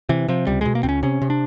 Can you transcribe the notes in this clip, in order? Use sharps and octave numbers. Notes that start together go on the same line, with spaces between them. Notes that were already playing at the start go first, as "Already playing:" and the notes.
C3 E3
C3 F3
C#2 G3
B2 G#3
A#3
C#2 C4
C#4
C3 C#4
C3
D4